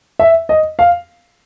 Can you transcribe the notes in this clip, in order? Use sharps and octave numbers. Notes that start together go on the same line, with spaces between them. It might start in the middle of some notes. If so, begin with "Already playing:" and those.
E5
D#5
F5